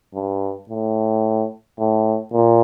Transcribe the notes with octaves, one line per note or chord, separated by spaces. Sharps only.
G2
A2
A2
A#2